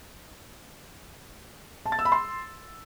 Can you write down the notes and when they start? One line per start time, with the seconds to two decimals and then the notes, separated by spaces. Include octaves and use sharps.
1.86 A5
1.92 A6
1.99 E6
2.05 B5
2.12 C6